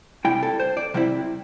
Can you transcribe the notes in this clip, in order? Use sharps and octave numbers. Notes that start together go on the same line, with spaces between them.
C3 G3 E4 G5
A4
C5
D5
C3 G3 C4 E4